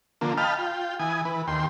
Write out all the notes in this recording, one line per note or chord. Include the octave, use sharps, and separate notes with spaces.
D3 F3 A#3
D#5 F5 G5 A5 B5 F6
F4 G5
E3 G#5 D#6
E3 B4
D#2 G5 C6